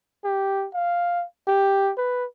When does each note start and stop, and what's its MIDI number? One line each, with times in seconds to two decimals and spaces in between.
0.25 0.67 67
0.74 1.25 77
1.47 1.92 67
1.98 2.25 71